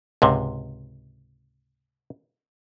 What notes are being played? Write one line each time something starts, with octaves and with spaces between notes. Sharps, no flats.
C#2 G#2 C3